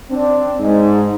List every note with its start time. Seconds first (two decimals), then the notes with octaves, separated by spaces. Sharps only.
0.10 C4 D4
0.60 G#2